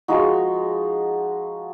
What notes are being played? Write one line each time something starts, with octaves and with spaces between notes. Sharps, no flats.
F3 G#3 D#4 F#4